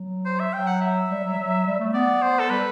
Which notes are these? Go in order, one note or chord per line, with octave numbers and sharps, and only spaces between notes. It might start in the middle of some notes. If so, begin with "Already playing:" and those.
Already playing: F#3
C5
E5
F#3 G5
F#5
E5
G3
F#3
F#3
G3
A3
B3 D5
C5
A4
G3 B4